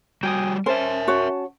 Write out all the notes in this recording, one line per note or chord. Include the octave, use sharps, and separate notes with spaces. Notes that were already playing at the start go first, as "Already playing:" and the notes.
G3 F#4 G5 G#5 D#6
C#4 A#4 C5 E5 A5
F#4 C#5